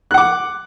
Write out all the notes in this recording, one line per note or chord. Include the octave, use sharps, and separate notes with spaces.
F#5 D6 F#6